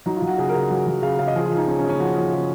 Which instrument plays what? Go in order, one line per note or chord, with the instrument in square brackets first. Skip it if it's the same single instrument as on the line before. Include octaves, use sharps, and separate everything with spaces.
[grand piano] F#3 D#4
F4
F#3
F#4
C#3 G#4
A#4
C#3
F#5
F#3
F#3
C#3 F5
C#3 F5
D#5
F3 G#4
F4
F3
D#4
C#3 C#4
C#4
C#3
C#4
F3 F#4
F3
C#3